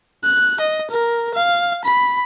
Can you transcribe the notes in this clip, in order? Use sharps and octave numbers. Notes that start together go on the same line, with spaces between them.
F#6
D#5
A#4
F5
B5